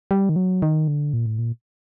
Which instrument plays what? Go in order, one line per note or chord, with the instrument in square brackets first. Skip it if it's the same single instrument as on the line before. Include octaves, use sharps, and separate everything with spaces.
[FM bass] G3
D#3
F#3
D#3
D3
A#2
A2
A#2